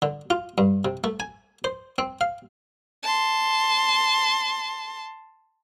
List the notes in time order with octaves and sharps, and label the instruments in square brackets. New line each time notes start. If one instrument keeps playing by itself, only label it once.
[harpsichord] D3
F4
G2
C3
A3
G#5
C5
C4
F5
[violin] A5 C6